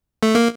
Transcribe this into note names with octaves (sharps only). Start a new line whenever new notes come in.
A3
A#3